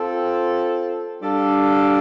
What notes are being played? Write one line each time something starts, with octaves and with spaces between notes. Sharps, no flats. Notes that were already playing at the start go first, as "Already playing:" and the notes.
Already playing: C4 F4 A4
G3 D4 A4 D5 F5